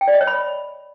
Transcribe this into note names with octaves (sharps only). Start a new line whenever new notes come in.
G5
D5
D#5
C#5
B5